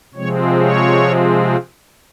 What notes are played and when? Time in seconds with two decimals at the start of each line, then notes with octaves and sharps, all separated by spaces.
0.14 C3 F3 G#3 C4 C#5
0.59 C#5